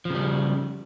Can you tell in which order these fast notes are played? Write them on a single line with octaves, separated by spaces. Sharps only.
F3 C#3 G3